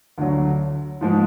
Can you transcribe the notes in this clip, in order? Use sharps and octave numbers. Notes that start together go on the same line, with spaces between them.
D2 D3 F#3
G#2 F3 G#3